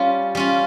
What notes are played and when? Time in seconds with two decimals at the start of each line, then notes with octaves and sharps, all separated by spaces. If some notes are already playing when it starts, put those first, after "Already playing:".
Already playing: G3 C#4 F4
0.35 G3 C#4 F4